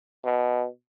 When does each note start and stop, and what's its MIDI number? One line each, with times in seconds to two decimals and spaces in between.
0.24 0.66 47